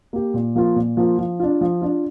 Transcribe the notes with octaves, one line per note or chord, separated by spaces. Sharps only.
A#3 G4
A#2
F3 A#3 F4
A#2
F3 A#3 F4
F3
D4 F4
F3
D4 F4